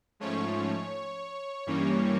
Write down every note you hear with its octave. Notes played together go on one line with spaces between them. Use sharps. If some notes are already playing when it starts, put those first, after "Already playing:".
G#2 F3 A3 C#4 C#5
G2 E3 G3 A#3 C#4